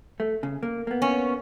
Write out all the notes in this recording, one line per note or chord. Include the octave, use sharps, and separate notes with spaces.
A3
C#3
A#3
A#3 B3
C#4